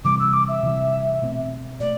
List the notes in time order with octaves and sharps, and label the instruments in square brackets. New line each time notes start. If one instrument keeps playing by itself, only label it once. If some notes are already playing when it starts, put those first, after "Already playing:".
[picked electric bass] C3 E3 G3 [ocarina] D6
[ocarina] E6
D6
E5
[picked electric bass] C3 E3 G3
B2 A3 C4
[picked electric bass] B2 A3 [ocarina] D5